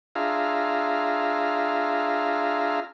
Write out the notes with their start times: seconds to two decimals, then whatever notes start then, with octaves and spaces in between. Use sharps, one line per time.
0.15 D4 F4 G#4 E5 F5 A#5